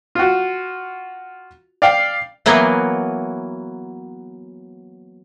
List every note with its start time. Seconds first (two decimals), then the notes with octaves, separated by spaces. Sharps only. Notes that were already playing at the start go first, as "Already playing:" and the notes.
0.15 F4 F#4
1.82 D5 F5 G5
2.46 E3 F#3 A#3 B3